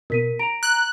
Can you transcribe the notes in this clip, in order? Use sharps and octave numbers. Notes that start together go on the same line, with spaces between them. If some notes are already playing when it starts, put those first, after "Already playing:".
B2 A#4 B6 D#7
A#5 D7 F7
F#6